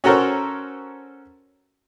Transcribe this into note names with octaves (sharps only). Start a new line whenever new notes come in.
C#4 F#4 A4 A#4 C5 C#5